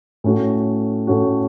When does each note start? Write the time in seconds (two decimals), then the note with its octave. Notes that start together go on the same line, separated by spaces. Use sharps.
0.24 A2 A3 C#4 F#4
1.07 A2 A3 C#4 F#4